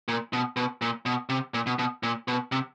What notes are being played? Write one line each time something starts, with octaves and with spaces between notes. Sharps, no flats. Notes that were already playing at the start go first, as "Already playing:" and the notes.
A#2
B2
B2
A#2
B2
C3
A#2
B2
B2
A#2
B2
C3